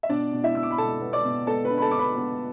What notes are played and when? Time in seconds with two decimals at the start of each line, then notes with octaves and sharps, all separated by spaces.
0.03 E5
0.10 B2 D4 D5
0.33 B2
0.44 E4 E5
0.55 B2 E6
0.63 D6
0.71 B5
0.78 B2 A4 A5
1.01 B3
1.13 D5 D6
1.25 B2
1.47 B3 A4 A5
1.65 B4 B5
1.70 D4
1.78 B5
1.82 A4 A5
1.91 D4 D6
1.99 B4 B5
2.17 B3